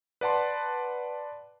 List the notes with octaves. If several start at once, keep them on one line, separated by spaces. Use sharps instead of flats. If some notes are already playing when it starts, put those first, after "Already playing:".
B4 D5 F#5 A5 C6